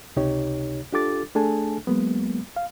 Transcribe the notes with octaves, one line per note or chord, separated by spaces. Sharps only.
C#2 C3 D#4 G4 C#5
D4 F4 G4 A4 D6 A6
A3 D4 G#4 A4 G#5 A5
F#3 G#3 A#3 B3
F5